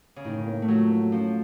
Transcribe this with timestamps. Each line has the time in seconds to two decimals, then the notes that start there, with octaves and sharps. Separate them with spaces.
0.16 C#3
0.25 A2 D#3
0.46 A#3
0.62 A3
0.68 F3 F#3
0.89 A#3
1.11 F3 C#4